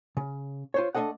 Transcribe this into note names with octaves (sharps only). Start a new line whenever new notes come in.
C#3
F4 C5 C#5
A3 D4 A4 D#5 F#5